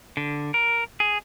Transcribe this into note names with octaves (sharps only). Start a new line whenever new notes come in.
D3
A#4
G#4